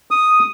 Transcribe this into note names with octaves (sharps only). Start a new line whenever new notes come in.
D#6